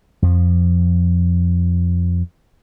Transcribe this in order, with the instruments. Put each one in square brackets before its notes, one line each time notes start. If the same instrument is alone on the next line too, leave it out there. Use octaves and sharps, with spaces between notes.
[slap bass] F2 F3